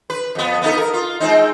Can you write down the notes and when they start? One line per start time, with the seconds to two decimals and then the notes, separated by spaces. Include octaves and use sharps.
0.10 B4
0.35 F2 B3
0.62 B3 D#4 A4
0.77 A#4
0.94 F4
1.20 G#3 C4 D#4